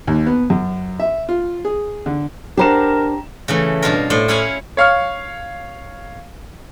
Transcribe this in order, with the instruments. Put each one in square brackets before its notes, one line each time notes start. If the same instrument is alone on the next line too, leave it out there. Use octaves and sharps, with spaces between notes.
[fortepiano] D#2
B3
F#2
E5
F4
G#4
D3
[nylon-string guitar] D4 C5 F#5 [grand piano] G4 A#5 E7 [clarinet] A#4
[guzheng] C#3 E3 A3
G2 B2 F4 A#4
A2 C5 D5
C#4 E4 C#5 F5 F#5 G#5
[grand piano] C#5 F5 C#6 F6